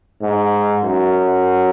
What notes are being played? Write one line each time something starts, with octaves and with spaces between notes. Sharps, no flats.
G#2
F#2